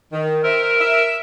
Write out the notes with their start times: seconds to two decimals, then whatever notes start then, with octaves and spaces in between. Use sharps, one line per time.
0.13 D#3
0.43 A#4 C5 E5
0.79 E5